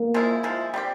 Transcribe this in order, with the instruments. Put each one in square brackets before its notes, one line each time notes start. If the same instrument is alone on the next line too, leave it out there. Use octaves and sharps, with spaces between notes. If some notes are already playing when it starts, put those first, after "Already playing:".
Already playing: [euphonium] A#3
[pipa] F3 G#3 E4
F3 G#3 E4
G3 C4 G4